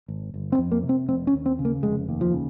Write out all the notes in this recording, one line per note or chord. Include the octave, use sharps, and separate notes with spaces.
G#1
G1
C4
F2
A#3
C3
C4
F1 C4
C#4
D#2
C4
C#3
A#3
F1 G#3
D#2
F3
C#3